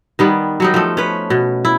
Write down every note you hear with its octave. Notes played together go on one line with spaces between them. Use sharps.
D#3 G3 B3
F#3 G3 D#4
F3 A3
C#4 B4
B2
E4